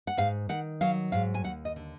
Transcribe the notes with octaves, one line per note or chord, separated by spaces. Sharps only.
F#5
G#2 F5
D#3 F#5
F#3 F5
G#2 F5
G#5
D#2 F#5
D#5
D3